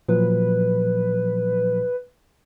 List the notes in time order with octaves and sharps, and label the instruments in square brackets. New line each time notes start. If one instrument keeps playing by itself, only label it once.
[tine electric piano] A#2 F3 F#3 [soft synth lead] B4